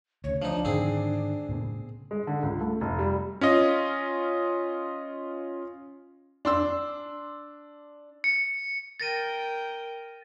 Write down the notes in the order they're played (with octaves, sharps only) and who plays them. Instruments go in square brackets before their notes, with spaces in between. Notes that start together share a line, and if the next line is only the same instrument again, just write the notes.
[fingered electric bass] D2 C#3 [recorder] C#5
[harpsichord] F3 D#4 [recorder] D4
[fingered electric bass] G#2 D3 D#3 [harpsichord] C4 G#4
[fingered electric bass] A2 C#3 B3
[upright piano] G#3
D3
C#2
A3
F1
G3
[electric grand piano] C#4 F4 D#5
[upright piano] D4 C6 E6
[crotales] C#7
[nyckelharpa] A#4 G5 [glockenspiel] A6 A#6 D#7